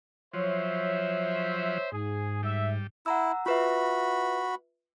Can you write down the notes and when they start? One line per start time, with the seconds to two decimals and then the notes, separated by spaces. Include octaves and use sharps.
0.34 F3 F#3 C5 C#5 E5
1.92 G#2 G#4
2.43 G3 E5
3.06 E4 F#5 A#5 E6
3.46 F4 F#4 B4 E5 B5